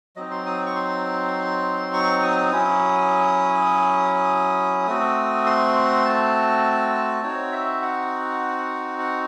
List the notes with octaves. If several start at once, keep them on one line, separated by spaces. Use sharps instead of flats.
F#3 C4 D#4 D#5
C6
D#6
C#6
C6
C#6
D#6
F#3 C#4 E4 D#6
A3 C4 F#4 D#6
C6
A5
C4 D#4 F#4 C#5
E5
F#5
F#5